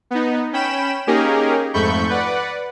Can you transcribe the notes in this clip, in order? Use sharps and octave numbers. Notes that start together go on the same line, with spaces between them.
B3 D#4
C#4 G5 B5 E7
A#3 C#4 D#4 G4 G#4 A#4
F2 G#2 A3 B5 C#6 G6
B4 D5 F#5